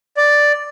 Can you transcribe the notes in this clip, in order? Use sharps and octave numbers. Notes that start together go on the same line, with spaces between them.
D5